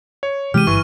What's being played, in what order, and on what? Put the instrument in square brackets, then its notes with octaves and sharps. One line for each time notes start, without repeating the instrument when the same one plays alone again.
[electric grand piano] C#5
[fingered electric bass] C3 E3 G#3 [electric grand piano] G4 [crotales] F6 D#7
[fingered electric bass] G1 [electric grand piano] E3 [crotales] C#6